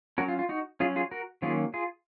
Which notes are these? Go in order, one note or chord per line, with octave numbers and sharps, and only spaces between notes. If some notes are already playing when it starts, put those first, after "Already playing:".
F#3 C#4 F#4 A#4
F4
F4
D#4 F#4
F#3 C#4 F4 G#4
F4 G#4
F#4 A#4
D#3 F#3 A#3 C#4 F4 G#4
F4 G#4